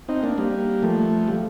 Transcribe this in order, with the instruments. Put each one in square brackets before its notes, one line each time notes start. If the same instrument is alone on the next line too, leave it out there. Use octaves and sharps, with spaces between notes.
[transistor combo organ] C4 D#4
A#3 D4
G3 A#3
F3 A3
G3